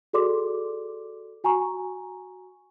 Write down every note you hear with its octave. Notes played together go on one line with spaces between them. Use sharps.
F#4 G#4 A4 D5 C6 D6
F#4 G#5 A#5 C#6